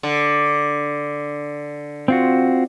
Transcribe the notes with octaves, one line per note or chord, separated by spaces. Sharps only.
D3
C4 F4 F#4